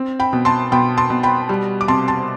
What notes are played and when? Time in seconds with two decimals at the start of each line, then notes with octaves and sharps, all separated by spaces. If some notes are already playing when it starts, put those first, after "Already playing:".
Already playing: C4
0.20 G5 B5
0.33 B2
0.45 A5 C6
0.72 B2 G5 B5
0.97 A5 C6
1.10 B2
1.23 G5 B5
1.49 G3
1.81 D6
1.88 C3 A5 C6
2.08 A5 C6